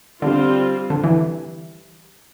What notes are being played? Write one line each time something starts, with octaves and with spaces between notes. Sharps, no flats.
D3 G3 C4 F4
D3
E3